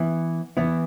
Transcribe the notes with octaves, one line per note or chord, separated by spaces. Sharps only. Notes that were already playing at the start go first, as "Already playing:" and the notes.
Already playing: E3 B3 E4
E3 B3 E4